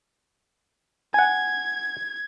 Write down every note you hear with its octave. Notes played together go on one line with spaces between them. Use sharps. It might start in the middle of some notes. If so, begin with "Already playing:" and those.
F#5 G#5 G#6